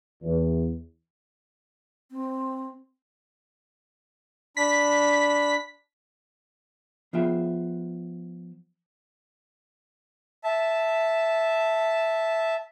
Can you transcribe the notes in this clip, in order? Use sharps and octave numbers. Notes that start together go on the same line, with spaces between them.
E2
C4
D4 B5 B6
F3 B3 F4 G#4 E5 G5
E5 A5